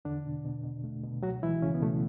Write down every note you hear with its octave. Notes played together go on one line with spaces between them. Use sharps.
E2 D3 D4
B2
B2
B2
A3
B2
C#2 F#3 F#4
E3 G#3 E4
C#2 C#3 C#4
B3
B2 A3